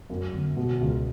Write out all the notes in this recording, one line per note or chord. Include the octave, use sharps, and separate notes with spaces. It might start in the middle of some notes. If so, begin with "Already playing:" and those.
F#2
G1
B2
C#2